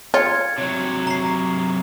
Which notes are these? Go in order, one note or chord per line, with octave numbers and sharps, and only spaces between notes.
F4 C#5 G#6 C#7
C3 F#3
A#5 C7